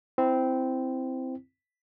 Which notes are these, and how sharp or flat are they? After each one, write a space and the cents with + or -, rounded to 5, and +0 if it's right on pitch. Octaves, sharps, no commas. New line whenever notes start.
C4 -10 E4 +0